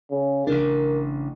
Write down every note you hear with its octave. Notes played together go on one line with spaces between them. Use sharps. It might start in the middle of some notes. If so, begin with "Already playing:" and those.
C#3
A1 C#3 D4 A#4